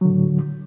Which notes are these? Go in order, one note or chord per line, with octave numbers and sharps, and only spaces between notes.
A2 D3 F#3